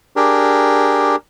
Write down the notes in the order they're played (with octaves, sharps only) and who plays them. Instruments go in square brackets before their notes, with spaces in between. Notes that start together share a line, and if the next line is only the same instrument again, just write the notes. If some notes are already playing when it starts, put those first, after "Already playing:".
[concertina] D4 G4 G#4 A#4